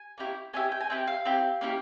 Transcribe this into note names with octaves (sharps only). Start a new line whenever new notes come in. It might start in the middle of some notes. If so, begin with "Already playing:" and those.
Already playing: G#5
A#3 C#4 E4 G4
A#3 C#4 E4 G4 G#5
G5
G#5
C4 E4 G4 G5
F5
C4 E4 G4
A#3 C#4 E4 G4